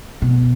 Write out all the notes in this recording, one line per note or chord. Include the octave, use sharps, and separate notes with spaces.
B2